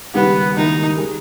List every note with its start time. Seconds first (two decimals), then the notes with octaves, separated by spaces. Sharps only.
0.14 D#2 C#3 G3 B3 C#4
0.56 G#2 D#3 A#3 D#4 E4 A#4
0.97 D#3 G#3 D#4 A#4